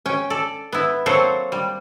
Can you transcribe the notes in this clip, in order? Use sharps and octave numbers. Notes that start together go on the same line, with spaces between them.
C#4 G5
A4 D5
B3 E4
F#3 A#3 C4 A4 C5 C#5
G3